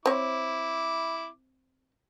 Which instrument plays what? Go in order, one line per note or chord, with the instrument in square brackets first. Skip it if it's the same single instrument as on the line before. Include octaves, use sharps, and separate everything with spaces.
[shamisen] C4 C#5 [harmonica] E4 D6